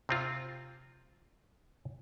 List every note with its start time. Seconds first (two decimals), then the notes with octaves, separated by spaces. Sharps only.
0.09 C3 C4 F4